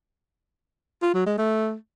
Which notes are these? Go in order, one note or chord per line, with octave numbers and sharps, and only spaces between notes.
F4
F#3
G#3
A3